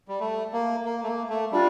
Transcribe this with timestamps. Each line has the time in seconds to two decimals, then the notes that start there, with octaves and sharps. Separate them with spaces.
0.08 G3
0.20 A3
0.53 A#3
0.85 A#3
1.03 A3
1.07 A#3
1.30 A3
1.51 G3 D4 F4